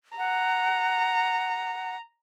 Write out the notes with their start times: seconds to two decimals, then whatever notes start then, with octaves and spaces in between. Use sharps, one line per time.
0.18 F#5 A#5